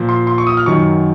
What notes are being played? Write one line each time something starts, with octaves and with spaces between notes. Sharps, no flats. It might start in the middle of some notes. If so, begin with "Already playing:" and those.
Already playing: A#2 F3
C6
C6
C#6
D#6
F6
F#2 D#3 F#3 C#6